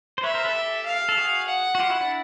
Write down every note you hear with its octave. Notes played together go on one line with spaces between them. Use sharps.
C5
B4 C#5 E5
A#4 C5
A4 B4
G4 A4
F5
A4
F#4 G#4
F#5
F#4
F4 G4
E4 F#4
D4 E4